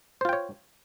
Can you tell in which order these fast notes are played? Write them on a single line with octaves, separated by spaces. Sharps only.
C5 F4 G5 C#5